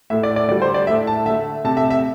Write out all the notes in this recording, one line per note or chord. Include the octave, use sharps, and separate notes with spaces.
A2 A3 E5
D5
D5
D3 G3 D5
C5
D5
A2 A3 E5
A5
D3 A3 E5
C3 A3 A5
E5
E5